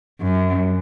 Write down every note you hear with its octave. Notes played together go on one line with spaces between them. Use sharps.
F#2